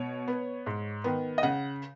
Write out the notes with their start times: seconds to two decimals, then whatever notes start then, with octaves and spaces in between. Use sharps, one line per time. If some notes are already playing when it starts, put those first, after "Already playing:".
Already playing: B2 C#5
0.28 B3
0.66 G#2
1.04 D#3 B3
1.38 D#5
1.43 C#3 F#5